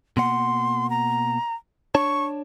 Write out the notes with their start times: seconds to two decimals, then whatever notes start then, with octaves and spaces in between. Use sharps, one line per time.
0.17 B2 A#3 F#5 C6
0.90 A#5
1.95 D4 C#5 A5 C#6